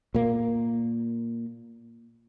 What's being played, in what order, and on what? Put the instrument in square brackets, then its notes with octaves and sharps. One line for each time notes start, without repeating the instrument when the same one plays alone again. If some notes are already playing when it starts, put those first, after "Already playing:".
[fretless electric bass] A#2 A#3